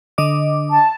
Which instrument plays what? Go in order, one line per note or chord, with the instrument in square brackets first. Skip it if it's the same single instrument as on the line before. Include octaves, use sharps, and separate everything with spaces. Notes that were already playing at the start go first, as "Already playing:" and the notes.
[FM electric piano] D3 D#5 D6
[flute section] A5